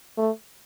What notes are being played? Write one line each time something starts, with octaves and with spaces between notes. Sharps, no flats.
A3